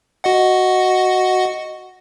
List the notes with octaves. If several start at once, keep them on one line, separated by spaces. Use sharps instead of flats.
F#4 D#5 F#5